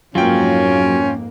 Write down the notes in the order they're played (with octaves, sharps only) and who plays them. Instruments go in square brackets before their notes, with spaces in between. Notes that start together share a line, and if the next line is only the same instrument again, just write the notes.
[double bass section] F2 G#2 A#3 [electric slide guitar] F#3 [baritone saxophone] C#4 [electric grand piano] F4 G5